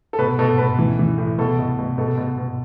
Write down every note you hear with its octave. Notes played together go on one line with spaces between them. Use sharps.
A4
B2 B4
B2 A4
B2 B4
E3
E3
A2
B2 A4
B2
B2
B2 A4
B2
B2